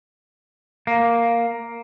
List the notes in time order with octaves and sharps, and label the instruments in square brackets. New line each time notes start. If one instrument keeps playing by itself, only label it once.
[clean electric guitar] A#3